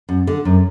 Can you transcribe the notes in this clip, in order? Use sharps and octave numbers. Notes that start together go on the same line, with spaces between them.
F#2
D3
F#2